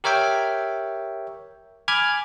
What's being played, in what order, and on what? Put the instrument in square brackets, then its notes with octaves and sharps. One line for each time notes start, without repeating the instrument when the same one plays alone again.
[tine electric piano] G4 A#4 C#5 E5 G5
G#5 B5 D6 F6 G#6